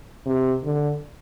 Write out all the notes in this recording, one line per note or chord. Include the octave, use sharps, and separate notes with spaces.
C3
D3